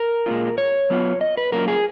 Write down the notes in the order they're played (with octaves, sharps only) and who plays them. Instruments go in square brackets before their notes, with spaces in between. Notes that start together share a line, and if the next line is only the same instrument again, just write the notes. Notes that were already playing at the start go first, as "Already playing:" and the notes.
Already playing: [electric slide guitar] A#4
A#2 G#3 C#4 F4
C#5
F#3 B3 F4
D#5
B4
F#3 A#3 C#4 F4 A#4
G#4